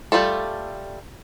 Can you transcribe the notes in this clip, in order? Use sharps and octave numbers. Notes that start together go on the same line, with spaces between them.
G3 A3 F4 A4